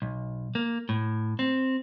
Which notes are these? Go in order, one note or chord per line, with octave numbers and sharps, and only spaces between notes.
B1
A#3
A2
C4